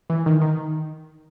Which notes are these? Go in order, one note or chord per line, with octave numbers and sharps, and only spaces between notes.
E3
D#3
D#3